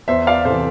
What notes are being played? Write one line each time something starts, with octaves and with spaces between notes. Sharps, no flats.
E2 C5 E5
D5 F5
C3 A4 C5
E3